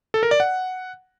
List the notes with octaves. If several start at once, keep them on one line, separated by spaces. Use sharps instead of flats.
A4
A#4
D5
F#5